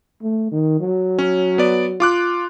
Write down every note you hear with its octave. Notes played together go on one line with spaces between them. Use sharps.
A3
D#3
F#3
C#4
B3 D5
F4 D6 F#6